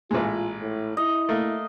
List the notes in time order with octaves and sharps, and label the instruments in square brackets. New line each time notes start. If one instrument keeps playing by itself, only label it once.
[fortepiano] A1 A#2 G#3 [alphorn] F4
[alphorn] A2
[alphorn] E4 [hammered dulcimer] D#5
[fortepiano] A3 A#3